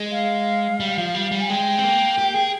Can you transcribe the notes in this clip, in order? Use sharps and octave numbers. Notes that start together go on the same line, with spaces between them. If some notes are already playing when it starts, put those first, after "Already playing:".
Already playing: G#3
F5
G3
F3
G3
G3
G#5
G#3 G5
C4
A#3
G4
G#4